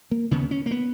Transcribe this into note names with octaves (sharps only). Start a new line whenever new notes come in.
A#3
D#2 C#3 B3
C#4
A#3
B3